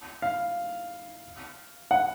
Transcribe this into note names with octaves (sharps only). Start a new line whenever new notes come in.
F5
F#5